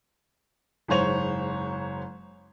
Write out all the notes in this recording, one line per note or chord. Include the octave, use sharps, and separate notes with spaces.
F#1 G#2 C5 C#5 F7